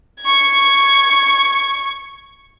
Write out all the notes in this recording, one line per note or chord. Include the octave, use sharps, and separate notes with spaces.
C#6 G#6